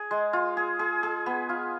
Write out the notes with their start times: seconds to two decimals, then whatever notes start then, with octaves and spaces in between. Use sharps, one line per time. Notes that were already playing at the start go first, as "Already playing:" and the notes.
Already playing: G#4
0.11 G#3
0.33 F4
0.57 G#4
0.79 G#4
1.03 G#4
1.26 B3
1.49 F4